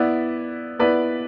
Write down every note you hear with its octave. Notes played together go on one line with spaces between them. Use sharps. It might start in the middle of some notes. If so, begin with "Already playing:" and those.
Already playing: B3 E4 B4 D5
B3 E4 B4 D5